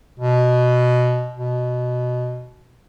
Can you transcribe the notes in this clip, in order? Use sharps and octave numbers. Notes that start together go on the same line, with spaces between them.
B2
B2